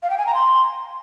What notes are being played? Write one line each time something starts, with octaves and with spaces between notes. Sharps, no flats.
F5
G5
G#5
A#5
C6